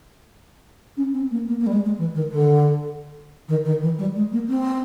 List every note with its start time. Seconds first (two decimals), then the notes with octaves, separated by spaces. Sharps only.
0.97 C#4
1.13 C4
1.31 A#3
1.48 A#3
1.60 A#3
1.66 G3
1.72 G#3
1.85 G#3
1.98 E3
2.15 D#3
2.31 D3
3.48 D#3
3.65 D#3
3.81 E3
3.98 G3
4.15 G#3
4.32 A#3
4.48 C4